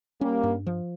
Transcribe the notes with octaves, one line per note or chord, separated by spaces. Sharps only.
G3 A#3 C#4
G2
F3